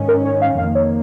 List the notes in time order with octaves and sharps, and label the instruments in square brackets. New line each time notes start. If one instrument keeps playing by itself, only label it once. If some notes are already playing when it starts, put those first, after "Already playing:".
Already playing: [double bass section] G#2 D#3 C#4
[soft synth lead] A#4
C#5
F5
[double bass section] F2 D#3 A#3 [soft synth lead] F5
[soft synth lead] C#5